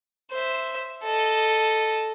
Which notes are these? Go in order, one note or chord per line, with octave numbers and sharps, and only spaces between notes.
C5 E5
A4 D#5